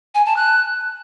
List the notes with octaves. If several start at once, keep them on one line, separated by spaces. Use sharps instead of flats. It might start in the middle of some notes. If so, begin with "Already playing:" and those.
G#5
A5
F#6